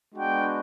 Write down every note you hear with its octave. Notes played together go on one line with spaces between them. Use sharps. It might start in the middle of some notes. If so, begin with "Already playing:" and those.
G#3 B3 D4 F#4 G5